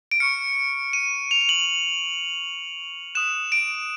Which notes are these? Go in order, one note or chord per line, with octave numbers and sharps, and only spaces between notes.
D7
C#6 F6 C#7
D#7
F7
F7
F#7
D#6 F#6 E7
D7